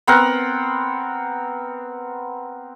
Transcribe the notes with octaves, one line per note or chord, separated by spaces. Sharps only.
B3 C4 A#4 F#5